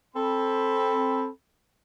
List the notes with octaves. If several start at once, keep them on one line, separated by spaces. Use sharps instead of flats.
C4 A4 B5